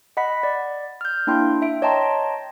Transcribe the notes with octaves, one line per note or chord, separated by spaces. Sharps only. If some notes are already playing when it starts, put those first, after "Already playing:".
D#5 F#5 B5 B6
D5
F6 G6
A#3 D4 E4 G5 C6
E5 D7
C#5 D#5 G5 A5 A#5 C6